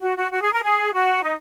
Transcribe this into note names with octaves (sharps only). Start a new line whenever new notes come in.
F#4
F#4
F#4
G#4
A#4
G#4
F#4
D#4